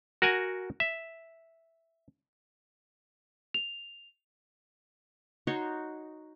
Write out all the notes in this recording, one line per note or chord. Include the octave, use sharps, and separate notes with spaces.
F#4 A#4 F#5 G#5
E5
F7
D#4 F#4 C#5 C6